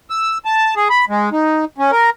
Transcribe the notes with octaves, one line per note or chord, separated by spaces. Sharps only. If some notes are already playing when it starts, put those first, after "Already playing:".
E6
A5
G#4
B5
G#3
D#4
C#4
A#4